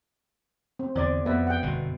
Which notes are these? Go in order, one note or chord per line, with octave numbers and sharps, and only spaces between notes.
C4
E2 D3 C4 D5
F2 B3 B4 E5
F#5 G5
G1 F#2 B2